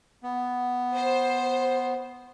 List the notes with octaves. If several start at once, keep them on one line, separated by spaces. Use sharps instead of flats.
B3
C5